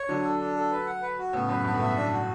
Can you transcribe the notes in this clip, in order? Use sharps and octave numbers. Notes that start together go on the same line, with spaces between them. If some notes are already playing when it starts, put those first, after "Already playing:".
Already playing: C#5
D3 F#3 D4
A4
D4
A4
B4
F#5
B4
F#4
A2 C#3 B3
F#2 A2 B4
G2 B3
A2
G2 B2 E5
D4
F#4